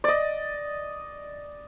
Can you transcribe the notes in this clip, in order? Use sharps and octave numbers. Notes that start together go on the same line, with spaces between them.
D5 D#5